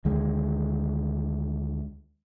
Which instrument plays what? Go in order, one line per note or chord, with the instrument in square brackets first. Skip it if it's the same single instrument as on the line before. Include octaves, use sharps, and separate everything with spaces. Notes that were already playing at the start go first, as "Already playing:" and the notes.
[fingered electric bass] D2 D#3 G#3